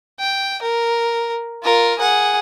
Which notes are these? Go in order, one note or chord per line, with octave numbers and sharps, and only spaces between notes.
G5
A#4
F4 A#4
G#4 F#5